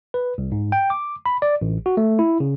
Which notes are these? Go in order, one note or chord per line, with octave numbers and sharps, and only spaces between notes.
B4
C2
G#2
G5
D6
B5
D5
A1
F#4
A3
E4
C#3